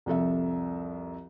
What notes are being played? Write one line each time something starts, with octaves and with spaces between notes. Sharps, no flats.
C2 F2 A4 E5